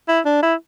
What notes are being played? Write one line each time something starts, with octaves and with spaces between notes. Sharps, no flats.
E4
D4
E4